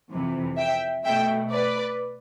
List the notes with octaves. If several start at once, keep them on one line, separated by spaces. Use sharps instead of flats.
F2 C3 E3
E5 G5
B2 A3 E5 G5
B4 D5